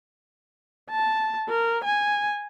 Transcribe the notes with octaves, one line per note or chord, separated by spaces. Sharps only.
A5
A#4
G#5